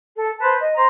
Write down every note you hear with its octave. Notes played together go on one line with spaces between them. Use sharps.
A4
B4 C5 A5
D#5
C5 A#5